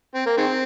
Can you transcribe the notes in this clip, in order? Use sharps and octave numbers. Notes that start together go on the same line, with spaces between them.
C4
A#3
D#3 G#3 C4